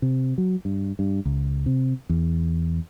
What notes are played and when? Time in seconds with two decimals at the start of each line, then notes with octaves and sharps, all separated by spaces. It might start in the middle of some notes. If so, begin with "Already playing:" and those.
0.02 C3
0.38 F#3
0.65 G2
0.99 G2
1.25 C#2
1.66 C3
2.09 E2